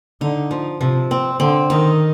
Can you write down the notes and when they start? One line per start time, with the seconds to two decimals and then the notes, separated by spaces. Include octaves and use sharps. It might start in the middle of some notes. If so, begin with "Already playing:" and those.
0.21 D3 D#4
0.51 F3
0.81 C3 F3
1.11 C4
1.40 D3 C4
1.70 D#3 D#4